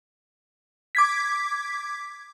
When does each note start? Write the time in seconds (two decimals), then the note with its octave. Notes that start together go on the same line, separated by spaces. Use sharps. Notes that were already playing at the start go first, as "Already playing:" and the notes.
0.95 D6 G#6 B6